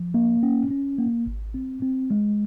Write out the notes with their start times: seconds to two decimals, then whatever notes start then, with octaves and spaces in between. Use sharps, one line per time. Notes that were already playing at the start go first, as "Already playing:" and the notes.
Already playing: F3
0.14 A#3
0.43 C#4
0.71 C#4
0.98 A#3
1.27 G#1
1.54 C4
1.82 C4
2.11 G#3